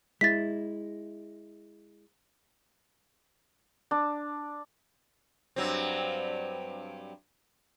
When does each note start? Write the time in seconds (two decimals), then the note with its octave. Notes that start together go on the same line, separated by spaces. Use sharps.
0.21 G#3 E4 A6 B6
3.91 D4
5.56 G2 F#3 C4